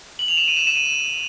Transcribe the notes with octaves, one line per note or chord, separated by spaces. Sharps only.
F#7
F7
E7
D#7
E7
E7
D#7
E7